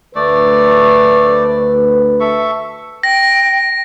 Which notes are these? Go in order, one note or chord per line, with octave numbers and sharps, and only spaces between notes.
D2 A3 B4 D5
A4 E5 C#6
G5 A#6